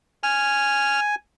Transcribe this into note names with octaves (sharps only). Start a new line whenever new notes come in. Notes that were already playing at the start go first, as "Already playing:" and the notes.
G#5 F6